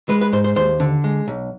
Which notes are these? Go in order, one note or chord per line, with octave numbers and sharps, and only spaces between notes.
G#3 B4
B4
G#2 C5
C5
D#2 C5
D3
G#3
B1